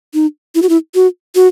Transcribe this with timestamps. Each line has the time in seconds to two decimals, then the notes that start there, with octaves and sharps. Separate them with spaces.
0.14 D#4
0.55 E4
0.62 F#4
0.69 E4
0.95 F#4
1.35 F#4